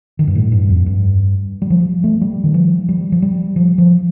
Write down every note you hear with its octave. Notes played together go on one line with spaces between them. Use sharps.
D#3
G2
A2
G2
F2
G2
G3
F3
A3
G3
D#3
F3
G3
F3
G3
F3
F3